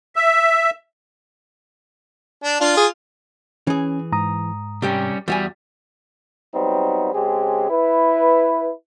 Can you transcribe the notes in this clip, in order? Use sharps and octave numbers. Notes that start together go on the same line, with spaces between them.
E5
D4
D4 F4 F5
G#4
E3 C#4 G#4
G#2 A#5 D#6
C3 G3 C#4 G4 G5
E2 G3 F#4 G#5
F#3 G3 B3 C4 D#4
C#3 G#3 C4 G4 G#4
E4 B4